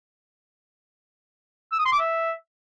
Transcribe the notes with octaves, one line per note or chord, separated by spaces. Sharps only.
E6
D#6
C6
D6
E5